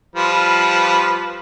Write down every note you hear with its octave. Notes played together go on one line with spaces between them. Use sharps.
F3 G3 B4